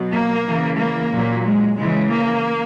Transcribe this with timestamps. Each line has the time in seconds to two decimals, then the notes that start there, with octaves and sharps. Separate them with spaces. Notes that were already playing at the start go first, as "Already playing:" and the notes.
Already playing: B2 F#3
0.11 A#3
0.44 C#3 E3
0.77 A#3
1.10 A#2 F#3
1.44 G#3
1.77 C#3 E3 G#3
2.10 A#3